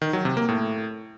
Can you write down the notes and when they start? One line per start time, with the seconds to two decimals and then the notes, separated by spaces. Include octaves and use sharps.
0.02 D#3
0.13 F#3
0.25 C3
0.37 A#3
0.49 A2